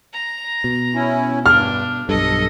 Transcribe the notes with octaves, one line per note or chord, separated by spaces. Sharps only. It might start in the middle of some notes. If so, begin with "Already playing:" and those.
A#5
B2
C#4 E4
G2 D4 F6
B1 G2 A4 D#5